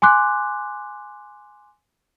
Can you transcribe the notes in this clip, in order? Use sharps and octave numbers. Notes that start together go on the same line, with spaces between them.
G#5 C6 D6 F#6